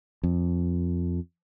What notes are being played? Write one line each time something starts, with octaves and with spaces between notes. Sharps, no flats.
F2